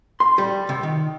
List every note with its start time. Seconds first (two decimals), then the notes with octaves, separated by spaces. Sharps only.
0.20 C6
0.38 G3
0.69 C3
0.83 D#3